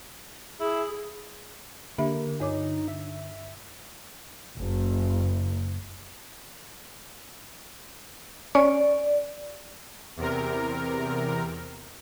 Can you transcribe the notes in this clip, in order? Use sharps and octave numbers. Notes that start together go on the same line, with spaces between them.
E4 G#4
D3 A#3 G4 E5 B5
G2 D#4 C#5 D6
E5
F#1
C#4 D5 C#6 C7
E2 C3 A#4